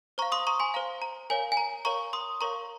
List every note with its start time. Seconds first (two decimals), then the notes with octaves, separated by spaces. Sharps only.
0.18 C5 A#5 C#6
0.22 F5
0.32 C6 D#6
0.47 A#5 C#6
0.60 G#5 C6
0.74 C5 F5 A#5
1.02 A#5
1.30 A#4 C#5 F5 G#5
1.52 G#5
1.57 A#5
1.85 A#4 C#5 F5 A#5 C#6
2.13 C6 D#6
2.41 A#4 C#5 F5 A#5 C#6